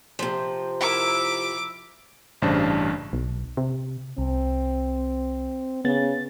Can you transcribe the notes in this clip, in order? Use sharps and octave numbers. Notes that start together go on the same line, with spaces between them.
C3 F3
E4 A#4 E5 D6
A1 G2 C#3 D4 C5 A5
B1
C3
C2 C4
C#3 B3 A6